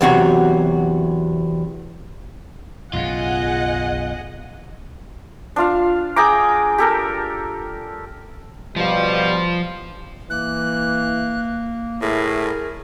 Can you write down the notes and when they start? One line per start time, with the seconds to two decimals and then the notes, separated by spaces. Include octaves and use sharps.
0.01 E2 C3 F#3 F#4
2.93 B1 F#2 C#3 F4 G#4 D#5 F#5
5.56 D4 F4 F5
6.16 G#4 G5 A#5 D6
6.78 G4 A4 A#4
8.76 B2 F3 G3 F4
10.30 E3 A#3 F#6
12.02 A2 E4 G#4 A#4